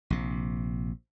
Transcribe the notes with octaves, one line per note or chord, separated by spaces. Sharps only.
A#1 C3